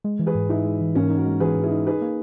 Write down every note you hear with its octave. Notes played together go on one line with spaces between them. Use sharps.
G#3
E3
G#4 B4
G#2
D#4 E4 G#4
G#3
E3
G#2 A#3 C#4
D#4
F#4 A#4
G#3
E3 G#4 B4
G#2
E4 G#4
D#4
D#4 G#4 B4
A#3